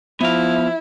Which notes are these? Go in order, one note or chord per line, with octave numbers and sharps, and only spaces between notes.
F3 B3 E4 E5 F5